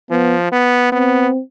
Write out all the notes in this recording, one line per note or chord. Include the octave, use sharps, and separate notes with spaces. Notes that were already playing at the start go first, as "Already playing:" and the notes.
F3 B3
B3
B3 C4